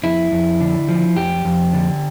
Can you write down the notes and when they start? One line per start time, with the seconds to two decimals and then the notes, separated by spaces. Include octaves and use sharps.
0.03 F2 E4
0.32 F2
0.61 D3
0.89 F3
1.16 F2 G4
1.45 F2
1.73 D3